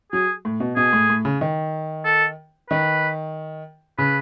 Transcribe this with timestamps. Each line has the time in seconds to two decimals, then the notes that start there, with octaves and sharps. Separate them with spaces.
0.13 F#3 G#4
0.45 A2
0.60 B2
0.76 B2 G#4
0.93 A2
1.10 A2
1.25 C#3
1.41 D#3
2.05 A4
2.70 D#3 B4
3.98 C#3 B4